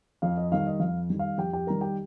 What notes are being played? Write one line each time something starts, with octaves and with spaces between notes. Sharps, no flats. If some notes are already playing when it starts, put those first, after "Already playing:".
F2 F5
D#5
D#3 G3 F5
D#5
F2 F5
D#3 G3
F5
F2 G4 G5
G4 G5
D#3 G3 A#4 A#5
G4 G5